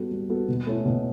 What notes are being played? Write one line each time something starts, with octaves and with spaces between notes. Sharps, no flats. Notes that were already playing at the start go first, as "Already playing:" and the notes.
Already playing: G3 B3 F#4 A4
G3
B3 F#4 A4
B2
A3 C#4 E4
B2